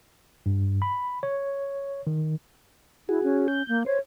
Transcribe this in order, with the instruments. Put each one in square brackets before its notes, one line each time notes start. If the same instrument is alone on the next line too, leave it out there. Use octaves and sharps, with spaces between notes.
[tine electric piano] G2
B5
C#5
D#3
[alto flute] E4 [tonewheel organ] F#4 G#4
[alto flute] C#4
[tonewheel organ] G6
[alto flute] A#3
[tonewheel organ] C5 [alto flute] C#5